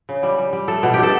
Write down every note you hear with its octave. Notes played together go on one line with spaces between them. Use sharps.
C#3
G3
G3
G3
A3 A4
B2
B2 G4
A4